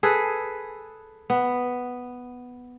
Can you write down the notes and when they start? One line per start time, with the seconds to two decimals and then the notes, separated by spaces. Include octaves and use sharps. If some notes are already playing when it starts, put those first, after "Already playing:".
0.03 G#4 A4 B4
1.30 B3